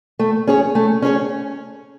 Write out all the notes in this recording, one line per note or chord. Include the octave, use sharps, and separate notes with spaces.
A3
C#4 G#4 C#5
A3
C#4 G#4 C#5